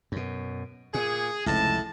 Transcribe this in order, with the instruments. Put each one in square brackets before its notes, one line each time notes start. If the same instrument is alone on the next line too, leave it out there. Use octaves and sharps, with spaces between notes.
[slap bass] F#2 B2
[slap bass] A#2 [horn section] G#4
[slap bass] F1 C#2 [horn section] A2 A5